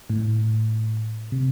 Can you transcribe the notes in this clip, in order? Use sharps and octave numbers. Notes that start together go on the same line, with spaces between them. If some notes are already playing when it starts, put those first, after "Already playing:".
A2
C3